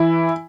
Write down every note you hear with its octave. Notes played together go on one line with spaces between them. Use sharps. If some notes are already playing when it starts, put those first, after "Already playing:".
Already playing: E3 E4